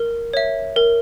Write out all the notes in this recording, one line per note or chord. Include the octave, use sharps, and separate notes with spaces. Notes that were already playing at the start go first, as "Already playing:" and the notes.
Already playing: A#4
C#5 E5
A#4